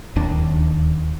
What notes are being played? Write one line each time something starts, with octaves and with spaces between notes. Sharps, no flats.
D1 D#2 D#3 D4